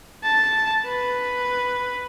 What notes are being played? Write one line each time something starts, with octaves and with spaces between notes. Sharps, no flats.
A5
B4